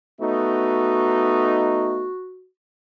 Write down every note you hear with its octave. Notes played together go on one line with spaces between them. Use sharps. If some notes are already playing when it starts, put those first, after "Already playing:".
A3 B3 D#4 F#4